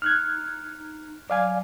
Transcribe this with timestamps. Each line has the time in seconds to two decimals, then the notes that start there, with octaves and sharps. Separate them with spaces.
0.02 D#4 F6 F#6 G#6
1.30 F#3 D5 F5 G#5